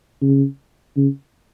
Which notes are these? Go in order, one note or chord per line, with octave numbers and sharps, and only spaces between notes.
C#3
C#3